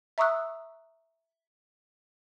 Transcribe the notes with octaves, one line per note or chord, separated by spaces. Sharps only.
E5 A#5 C#6 D#6 E6 F#6